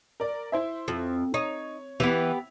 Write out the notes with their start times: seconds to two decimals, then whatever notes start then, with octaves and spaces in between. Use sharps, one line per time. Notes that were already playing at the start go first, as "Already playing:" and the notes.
0.20 A#4 D5
0.52 E4 C5 E5
0.88 F2
1.34 D#4 C#5
2.00 E3 B3 G4 F7